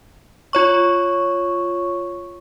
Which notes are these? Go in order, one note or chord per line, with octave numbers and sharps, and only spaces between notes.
F4 C#5 C#6